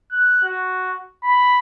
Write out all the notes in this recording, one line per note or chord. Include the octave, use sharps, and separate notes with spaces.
F#6
F#4
B5